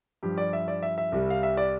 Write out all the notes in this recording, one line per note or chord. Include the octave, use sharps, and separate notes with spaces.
G2 F3 G4
D5
E5
D5
E5
E5
C2 C3 G3
F5
E5
D5